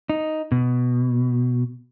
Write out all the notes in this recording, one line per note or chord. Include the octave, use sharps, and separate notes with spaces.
D#4
B2